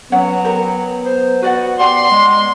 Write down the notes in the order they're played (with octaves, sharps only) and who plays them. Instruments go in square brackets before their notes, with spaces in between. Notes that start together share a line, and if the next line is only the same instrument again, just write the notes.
[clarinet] F#3 [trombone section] B3 [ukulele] C#4 C#5 F#5
[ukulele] G4 A#4
[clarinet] C5
[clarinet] F#4 [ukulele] B4 D5 F#5
[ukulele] G4 F#5 [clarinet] D5 [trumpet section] C6
[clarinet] G#3